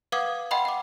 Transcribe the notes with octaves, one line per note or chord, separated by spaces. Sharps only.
B4 F5 F#5 D6 D#6 G#6
D#5 F#5 G5 B5 C6
F#5 D6